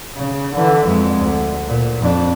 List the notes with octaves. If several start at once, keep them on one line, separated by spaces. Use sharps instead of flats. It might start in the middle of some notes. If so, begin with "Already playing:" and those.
C#3
D3 E3
F2 G#3
D2
A#2
F2 D4